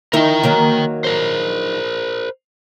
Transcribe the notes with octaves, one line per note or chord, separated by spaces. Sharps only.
D#3 D#4 E4 A#4 G5
D#3 F#3 A#3
A#4 C5